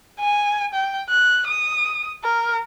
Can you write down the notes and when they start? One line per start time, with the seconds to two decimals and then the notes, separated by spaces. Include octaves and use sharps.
0.20 G#5
0.74 G5
1.09 F#6
1.48 D#6
2.24 A#4